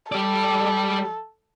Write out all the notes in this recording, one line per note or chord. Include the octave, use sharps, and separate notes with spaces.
G3 A4 D5